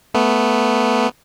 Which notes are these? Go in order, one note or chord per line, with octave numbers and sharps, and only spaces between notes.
A3 B3